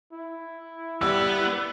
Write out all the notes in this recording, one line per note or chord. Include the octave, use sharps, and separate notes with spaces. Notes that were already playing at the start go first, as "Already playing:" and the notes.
E4
G3 B3 B4 E6